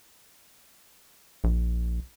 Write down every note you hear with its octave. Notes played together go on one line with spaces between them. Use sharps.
A#1